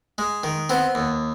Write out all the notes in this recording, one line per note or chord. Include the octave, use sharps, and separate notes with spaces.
G#3
D#3
B3 C4
D#2